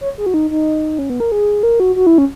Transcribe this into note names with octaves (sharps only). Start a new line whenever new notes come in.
C#5
G#4
F#4
D#4
D#4
C#4
B3
A#4
G#4
A#4
F#4
F#4
E4
C#4